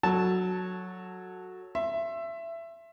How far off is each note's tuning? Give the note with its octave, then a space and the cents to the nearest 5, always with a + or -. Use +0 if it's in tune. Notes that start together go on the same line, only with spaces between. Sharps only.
F#3 -5 A4 +5 A5 +0
E5 +20 C6 +30